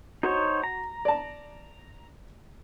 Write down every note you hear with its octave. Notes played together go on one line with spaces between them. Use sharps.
D#4 F#4 C5 C#5
A#5
D5 A5